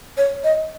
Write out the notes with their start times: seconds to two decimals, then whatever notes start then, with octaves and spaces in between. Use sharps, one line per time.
0.18 C#5
0.44 D#5